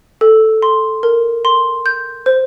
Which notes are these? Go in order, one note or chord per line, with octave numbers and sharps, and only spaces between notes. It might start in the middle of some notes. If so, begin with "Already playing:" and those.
A4
C6
A#4
C6
G6
C5